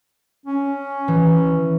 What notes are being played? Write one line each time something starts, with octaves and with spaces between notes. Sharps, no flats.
C#4
E3